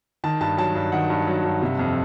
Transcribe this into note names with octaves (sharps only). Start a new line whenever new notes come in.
D#3 A5
G2 A5
F#3 A5
G2
D#3 F#5
G2
F#3
G2
C3
F2